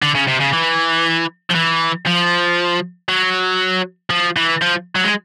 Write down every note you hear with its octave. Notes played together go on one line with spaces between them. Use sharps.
D3
C#3
C3
C#3
E3
F3
E3
F3
F#3
F3
E3
F3
F#3
G#3